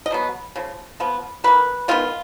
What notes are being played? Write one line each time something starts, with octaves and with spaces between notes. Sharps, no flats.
D#5
B2 F#3 B3
C#3 F3
F3 B3
D#3 A#3 B4
D#3 G#3 B3 F4